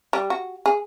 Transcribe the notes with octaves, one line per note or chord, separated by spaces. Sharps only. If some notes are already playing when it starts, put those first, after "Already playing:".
G3
F#4
G#4